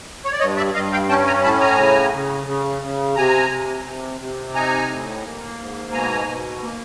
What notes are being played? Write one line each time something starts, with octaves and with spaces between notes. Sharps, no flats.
C#5
D5
G2 C#5 D#5
D5 E5
G2 D#5 F5
F5 G5
C#4 G5 A5
G#5 A#5
A2 A5 B5
G#5 A#5
C#3
C#3
C#3
C#3
C3 G#5 A#5
C3
C3
C3
D#4 G#5 A#5
A2
A#3
G#2
B2 G#5 A#5
B2
A#3